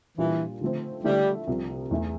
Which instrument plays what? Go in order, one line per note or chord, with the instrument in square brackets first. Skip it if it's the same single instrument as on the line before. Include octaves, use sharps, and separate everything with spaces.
[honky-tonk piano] A#2 G3 D4 F4 [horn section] E3
[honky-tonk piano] D3 F3 A3 C4
[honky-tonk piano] D3 F3 A3 E4 [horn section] G3
[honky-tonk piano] C2 C3 F3
E2 E3 A3 E4